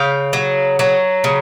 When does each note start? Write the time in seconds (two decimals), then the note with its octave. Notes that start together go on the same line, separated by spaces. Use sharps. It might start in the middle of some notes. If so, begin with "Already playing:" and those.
Already playing: C#3 F5 G5
0.33 F#3
0.79 F#3
1.24 C#3